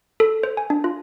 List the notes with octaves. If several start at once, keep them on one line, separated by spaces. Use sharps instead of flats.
A4
C5
G#5
D4
F4